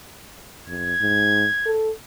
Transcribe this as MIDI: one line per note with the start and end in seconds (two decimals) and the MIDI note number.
0.67 0.94 41
0.67 1.72 92
1.01 1.46 44
1.66 1.91 69